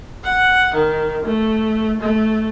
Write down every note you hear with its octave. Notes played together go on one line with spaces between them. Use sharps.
F#5
D#3
A3
A3